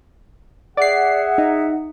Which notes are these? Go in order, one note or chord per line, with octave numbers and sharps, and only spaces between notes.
G#4 D5 E5 F#5 C7
D#4